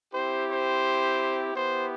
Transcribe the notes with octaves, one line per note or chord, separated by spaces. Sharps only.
C4 E4 G4 C5
C5
B3 E4 G4 C5